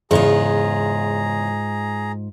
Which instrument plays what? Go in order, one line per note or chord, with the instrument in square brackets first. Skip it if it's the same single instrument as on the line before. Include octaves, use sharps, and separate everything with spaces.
[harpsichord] E2 C#3 [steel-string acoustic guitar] G#2 F4 [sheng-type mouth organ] G#4 A#5